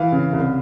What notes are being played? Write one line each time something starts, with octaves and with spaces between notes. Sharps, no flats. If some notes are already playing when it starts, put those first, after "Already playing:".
Already playing: E3 F5
C#3
C2